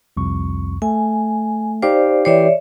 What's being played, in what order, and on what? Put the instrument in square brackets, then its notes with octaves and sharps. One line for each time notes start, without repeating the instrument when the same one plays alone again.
[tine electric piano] C2 F2 C#6
[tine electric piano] A3 [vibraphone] G#5
[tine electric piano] D#4 G4 F5 [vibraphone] C5 D5
[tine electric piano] E3 G4 C7 [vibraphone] C#5 D5 E5